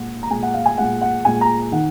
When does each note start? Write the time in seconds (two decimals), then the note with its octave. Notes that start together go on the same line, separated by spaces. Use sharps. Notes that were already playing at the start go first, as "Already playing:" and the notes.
Already playing: A#2 G#3 F#5
0.23 A#5
0.30 A#2 G#3 G#5
0.43 F#5
0.54 F5
0.66 G#5
0.78 A#2 G#3 F#5
1.01 F#5
1.25 A#2 G#3 G#5
1.41 A#5
1.72 D#3 F#5